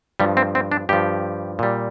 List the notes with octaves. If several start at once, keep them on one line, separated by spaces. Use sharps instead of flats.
G2 F3 G3
C4
C4
D4
G2 F3 G4
A#2 G3